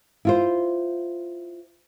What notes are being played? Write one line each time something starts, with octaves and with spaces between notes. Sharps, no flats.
E4 F4 C5